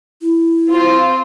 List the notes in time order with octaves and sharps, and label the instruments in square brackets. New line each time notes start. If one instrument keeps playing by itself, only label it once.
[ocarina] E4
[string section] C4 F4 C5